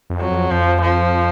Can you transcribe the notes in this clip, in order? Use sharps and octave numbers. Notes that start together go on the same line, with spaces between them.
F2
F#3
F2
F2 F3
F3